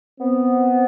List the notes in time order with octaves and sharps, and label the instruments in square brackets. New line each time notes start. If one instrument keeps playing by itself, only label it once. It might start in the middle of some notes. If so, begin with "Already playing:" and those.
[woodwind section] B3 [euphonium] C4